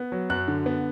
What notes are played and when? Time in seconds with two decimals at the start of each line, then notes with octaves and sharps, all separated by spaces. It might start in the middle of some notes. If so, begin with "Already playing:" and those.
Already playing: B3
0.12 F#3
0.30 F#2 F#6
0.48 D3
0.66 B3